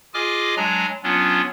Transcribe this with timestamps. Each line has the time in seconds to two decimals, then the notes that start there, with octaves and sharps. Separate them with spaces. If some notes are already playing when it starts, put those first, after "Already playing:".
0.14 F4 G#4 D#5 G#5 D6 F6
0.57 F#3 G#3 D4 G#5 A#5
1.03 F#3 B3 C#4 D4 F4